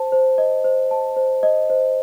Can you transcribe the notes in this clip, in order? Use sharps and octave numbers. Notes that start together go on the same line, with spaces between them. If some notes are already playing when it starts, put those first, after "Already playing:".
Already playing: C5 A5
C5
D#5
C5
A5
C5
D#5
C5